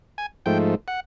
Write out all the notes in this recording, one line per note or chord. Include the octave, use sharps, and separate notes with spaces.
G#5
G#2 F3 A3 G5
F#5